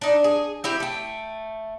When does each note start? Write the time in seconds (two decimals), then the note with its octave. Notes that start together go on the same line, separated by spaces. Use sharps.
0.01 D4 D#4
0.24 G#4
0.64 C4 E4 G4
0.80 A3 G5